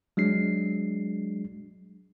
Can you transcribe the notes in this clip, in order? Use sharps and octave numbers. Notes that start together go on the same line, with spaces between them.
F#3 G#3 D4 C7